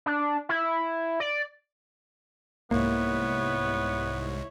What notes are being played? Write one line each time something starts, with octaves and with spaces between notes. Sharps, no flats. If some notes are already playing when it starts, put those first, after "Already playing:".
D4
E4
D5
C2 G#2 A#3 B3 E4 C#5